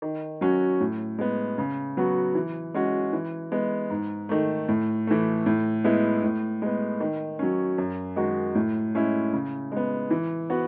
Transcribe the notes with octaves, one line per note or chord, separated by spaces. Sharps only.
D#3
F#3 C#4 F#4
A2
G#3 B3
C#3
F#3 B3 F#4
E3
G#3 C#4 F#4
E3
G#3 B3
G#2
D#3 A3
A2
E3 A3
A2
G#3 B3 E4
A2
G#3 B3
D#3
F#3 C#4
F#2
D#3 G#3 D#4 F#4
A2
G#3 C#4 E4
C#3
G#3 B3
E3
B3 F#4